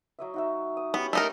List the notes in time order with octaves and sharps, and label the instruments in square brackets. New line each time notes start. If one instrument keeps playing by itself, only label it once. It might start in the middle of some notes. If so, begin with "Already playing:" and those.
[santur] F#3 D#5 E5
D#4 F#4 E5
D#6
[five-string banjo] B3 [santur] C#4 E4 G4
[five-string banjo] A3 D#4 A#4